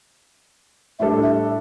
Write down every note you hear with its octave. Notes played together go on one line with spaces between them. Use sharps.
A2 G3 D4 A4 E5
E5